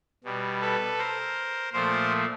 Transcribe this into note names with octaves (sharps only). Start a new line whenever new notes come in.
B2 G3
A4 B4
A#4 C5
A#2 F3 A3 A#4 C5